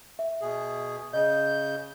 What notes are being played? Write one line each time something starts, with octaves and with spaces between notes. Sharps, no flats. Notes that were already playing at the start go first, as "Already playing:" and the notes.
E5
B2 G#4
C#3 D#5 G6